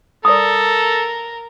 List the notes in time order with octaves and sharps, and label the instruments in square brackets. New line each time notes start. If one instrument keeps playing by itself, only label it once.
[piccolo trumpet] A4 [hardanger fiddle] A#4 [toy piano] D5 D#6